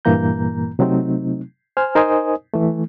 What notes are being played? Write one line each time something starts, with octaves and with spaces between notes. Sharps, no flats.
G2 A#2 E3 A#3 A#5 G6
C3 F#3 A3 C4 D#4
C5 G#5 F6
D#4 A#4 C5 D#5 G#5 D#6
E3 A3